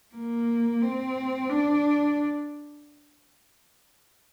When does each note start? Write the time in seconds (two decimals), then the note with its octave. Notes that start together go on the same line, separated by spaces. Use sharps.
0.15 A#3
0.82 C4
1.49 D4